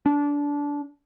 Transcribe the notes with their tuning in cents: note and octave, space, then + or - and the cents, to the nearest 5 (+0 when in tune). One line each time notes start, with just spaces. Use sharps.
D4 -20